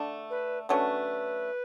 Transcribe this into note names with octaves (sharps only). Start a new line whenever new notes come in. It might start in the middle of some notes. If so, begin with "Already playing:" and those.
Already playing: D3 A3 D4
B4
D3 F#3 A3 C#4 B4